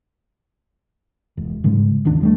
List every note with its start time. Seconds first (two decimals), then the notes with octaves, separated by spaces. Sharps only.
1.37 E1
1.64 G#2 C#3 G3 G#3
2.05 D#1 D2 D#3 D4
2.21 E2 G3 A3